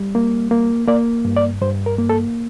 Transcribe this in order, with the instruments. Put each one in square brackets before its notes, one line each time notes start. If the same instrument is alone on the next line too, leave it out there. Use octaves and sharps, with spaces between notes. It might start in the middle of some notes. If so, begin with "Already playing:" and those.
Already playing: [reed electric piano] G3
A#3
A#3
A#3 D5
G2
D5
G2 C5
A#4
A#3
A4